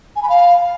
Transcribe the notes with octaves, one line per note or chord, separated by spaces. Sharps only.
G#5
B5
F5